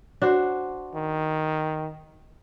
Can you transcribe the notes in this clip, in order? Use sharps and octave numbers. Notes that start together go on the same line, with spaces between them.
D4 F#4 C5
D#3